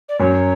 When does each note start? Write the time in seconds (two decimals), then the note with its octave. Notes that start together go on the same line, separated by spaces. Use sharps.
0.09 D5
0.19 F#2 F#3 C#5